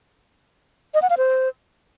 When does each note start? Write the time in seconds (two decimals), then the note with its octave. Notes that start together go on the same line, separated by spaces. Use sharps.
0.94 D#5
1.02 F#5
1.10 F5
1.18 C5